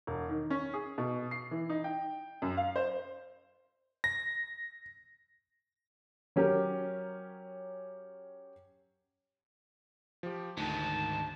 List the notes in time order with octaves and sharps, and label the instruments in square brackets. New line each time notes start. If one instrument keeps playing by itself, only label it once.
[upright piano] E1
D#3
C#4
G#4
B2
C7
E3
D#4
G5
F#2
F5
C5
[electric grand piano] A#6
[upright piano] F#3 C#4 G4 A#4
[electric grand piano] F3 G4
[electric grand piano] D2 [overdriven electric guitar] G#2 D#3 [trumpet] A5